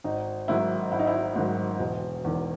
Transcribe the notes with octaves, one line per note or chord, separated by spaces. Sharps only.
G#1 D#4
G#2 D#3 F#3 E4
G#1 E4
D#4
E4
G#2 D#3 F#3
E1
E2 D#3